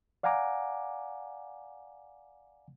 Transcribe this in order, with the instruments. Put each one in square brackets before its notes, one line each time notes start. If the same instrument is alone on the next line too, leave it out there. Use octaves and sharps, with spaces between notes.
[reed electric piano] D5 F5 F#5 G#5 A#5 D6